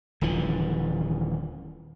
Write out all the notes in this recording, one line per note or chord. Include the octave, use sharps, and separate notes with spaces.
D#1 D3 E3 F3